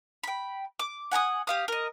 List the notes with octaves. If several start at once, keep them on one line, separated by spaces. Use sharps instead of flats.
G5 B5
D6
F#5 G#5 A#5 D#6
G4 F5 D#6
A#4 D#5